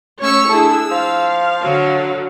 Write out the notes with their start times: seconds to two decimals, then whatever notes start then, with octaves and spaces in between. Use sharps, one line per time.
0.20 A3 C#4 C#5 C#6 E6
0.49 D4 E4 G#4 A4 E6
0.91 F3 F5
1.62 D3 F#3